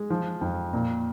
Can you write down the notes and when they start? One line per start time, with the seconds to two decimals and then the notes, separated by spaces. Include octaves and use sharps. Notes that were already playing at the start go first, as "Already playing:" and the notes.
Already playing: G#3
0.10 F3
0.41 F2
0.73 A#2